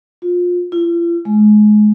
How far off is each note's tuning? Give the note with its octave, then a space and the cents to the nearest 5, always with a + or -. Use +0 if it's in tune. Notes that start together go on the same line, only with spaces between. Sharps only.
F4 +25
F4 -45
G#3 +25